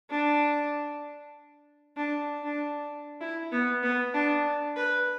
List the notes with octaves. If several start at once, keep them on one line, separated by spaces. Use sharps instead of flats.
D4
D4
D4
E4
B3
B3
D4
B4